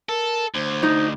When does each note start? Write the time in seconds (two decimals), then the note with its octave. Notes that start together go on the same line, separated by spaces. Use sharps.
0.09 A4 A#4
0.54 D2 C5
0.83 D#4